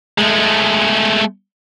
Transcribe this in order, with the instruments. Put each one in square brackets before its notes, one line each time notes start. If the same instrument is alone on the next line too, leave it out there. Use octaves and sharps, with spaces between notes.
[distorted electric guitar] G#3 A3